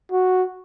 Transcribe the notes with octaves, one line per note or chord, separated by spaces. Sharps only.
F#4